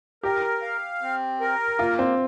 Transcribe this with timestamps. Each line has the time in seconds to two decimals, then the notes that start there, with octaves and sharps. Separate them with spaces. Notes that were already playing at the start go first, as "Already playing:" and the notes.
0.23 G4 A#4
0.62 F5
1.02 C4
1.41 A#4
1.79 A#3 F4
1.99 C4